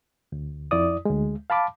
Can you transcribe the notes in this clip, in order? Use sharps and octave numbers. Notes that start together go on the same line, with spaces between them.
D2
F2 E4 D5 D#6
D2 G#3
F5 A5 B5 D6